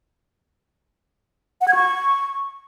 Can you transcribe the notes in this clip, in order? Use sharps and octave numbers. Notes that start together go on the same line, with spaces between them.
F#5
G#6
C#6